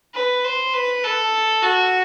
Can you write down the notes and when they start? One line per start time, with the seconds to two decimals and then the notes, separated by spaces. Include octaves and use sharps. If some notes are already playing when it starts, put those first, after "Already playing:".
0.14 B4
0.44 C5
0.74 B4
1.03 A4
1.63 F#4